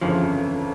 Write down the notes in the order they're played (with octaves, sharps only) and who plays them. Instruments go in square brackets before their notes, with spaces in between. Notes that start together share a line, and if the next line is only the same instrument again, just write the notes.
[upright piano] G1 F2 C#3 E3 [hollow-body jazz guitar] F3